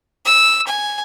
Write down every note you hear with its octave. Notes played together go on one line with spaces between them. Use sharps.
E6
G#5